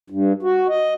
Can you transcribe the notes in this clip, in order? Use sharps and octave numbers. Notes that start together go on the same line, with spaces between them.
G2
F#4
D#5